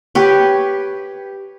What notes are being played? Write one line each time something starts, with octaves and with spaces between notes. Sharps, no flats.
G4 B4 C#5